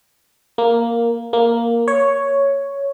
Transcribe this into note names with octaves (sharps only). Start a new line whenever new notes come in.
A#3
A#3
C#5